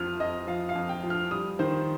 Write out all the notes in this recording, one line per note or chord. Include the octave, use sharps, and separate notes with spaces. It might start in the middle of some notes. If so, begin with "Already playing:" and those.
Already playing: F2 F3 F6
F2 D#5
F3 F5
F5
F2
G5
F3
F6
G3 D#6
D#3 C5